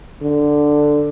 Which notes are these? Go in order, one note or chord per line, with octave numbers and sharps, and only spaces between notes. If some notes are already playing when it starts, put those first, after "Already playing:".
D3